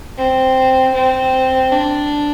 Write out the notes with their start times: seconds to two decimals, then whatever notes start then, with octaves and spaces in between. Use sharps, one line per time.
0.17 C4
0.94 C4
1.72 D4